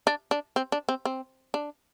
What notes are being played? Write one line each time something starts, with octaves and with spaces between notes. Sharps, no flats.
D4
D4
C4
D4
C4
C4
D4